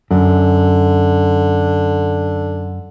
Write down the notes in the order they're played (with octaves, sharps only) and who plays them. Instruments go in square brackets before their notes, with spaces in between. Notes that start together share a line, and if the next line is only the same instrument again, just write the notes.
[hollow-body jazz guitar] F#2 [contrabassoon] D3